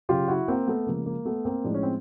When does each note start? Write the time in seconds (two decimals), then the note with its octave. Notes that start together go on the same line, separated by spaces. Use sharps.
0.09 C#3 F#3 F4 G4
0.28 E4 F#4
0.48 A#3 C4
0.67 A3 B3
0.86 C#3 F3 G#3 A#3
1.06 A#3
1.25 A3 B3
1.45 A#3 C4
1.64 A2 F3 G#3 D4
1.74 C#4
1.83 C4